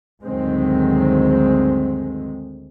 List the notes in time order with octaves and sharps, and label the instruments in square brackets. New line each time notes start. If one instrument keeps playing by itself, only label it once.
[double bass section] G1 D2 D#3 F#3 G#3 C4